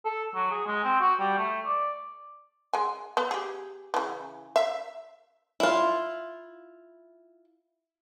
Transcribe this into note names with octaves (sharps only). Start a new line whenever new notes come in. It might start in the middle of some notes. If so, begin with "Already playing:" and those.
A4
F#3
G#4
G#3
C4
F#4
G3
A3
D5
G#3 G#5
B3
G4 G#4
C#3 E3
E5
E4 F4